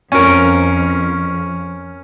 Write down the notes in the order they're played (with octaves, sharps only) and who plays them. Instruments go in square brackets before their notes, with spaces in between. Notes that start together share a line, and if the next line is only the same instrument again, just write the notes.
[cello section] F2 [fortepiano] C#4 A#4